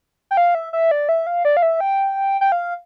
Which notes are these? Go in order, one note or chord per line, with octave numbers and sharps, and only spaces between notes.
G5
F5
E5
E5
D5
E5
F5
D5
F5
E5
G5
G5
F5